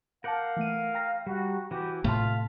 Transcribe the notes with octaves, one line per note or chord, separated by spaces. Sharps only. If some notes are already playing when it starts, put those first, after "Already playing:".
A#4 F5 F#5 A5 D6 G6
E3 A3 D#7
G5 A#5 A#6
G3 F#4
E3 F#4 G4
A2 C3 A3 F4 F5 A5 C6 B6